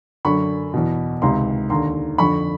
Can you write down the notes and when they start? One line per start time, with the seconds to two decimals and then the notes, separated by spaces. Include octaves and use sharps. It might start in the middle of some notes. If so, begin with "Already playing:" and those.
0.25 F#2 D3 B5 C#6
0.74 E2 B2
1.22 C#2 C3 D#3 A#5 C6
1.70 D#2 D3 A#5 C6
2.18 F2 D3 B5 C#6